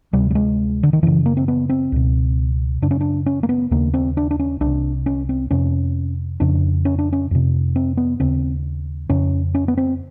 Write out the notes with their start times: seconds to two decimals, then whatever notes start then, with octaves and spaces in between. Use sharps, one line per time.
0.13 D2 C3 G3
0.31 G3
0.35 G#3
0.83 D3
0.93 D#3
1.03 F#2 C#3 E3
1.26 A#3
1.37 C4
1.48 B3
1.69 C4
1.92 C#2 B2
2.82 F#2 C#3 D4
2.91 C#4
3.01 D4
3.26 C#4
3.43 A#3
3.49 B3
3.71 D#2 C#3 A#3
3.94 C4
4.17 D4
4.31 D4
4.39 C#4
4.61 C2 D4
4.66 C3
5.06 C#4
5.29 C4
5.51 F2 C3 C#4
6.40 F2 C#3 D4
6.85 C#4
6.99 D4
7.13 C#4
7.31 F2 C3
7.76 C4
7.97 B3
8.20 D#2 C#3 C4
9.10 F2 C#3 C#4
9.55 C#4
9.68 B3
9.77 C4